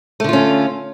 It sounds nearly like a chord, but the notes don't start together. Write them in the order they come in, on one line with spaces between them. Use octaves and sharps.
A3 D3 F4 C#4